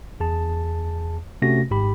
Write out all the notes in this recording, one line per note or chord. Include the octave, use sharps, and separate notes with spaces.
E2 G#4 A5
C3 A3 C#4 F#4 A#6
G#1 G#2 G4 B5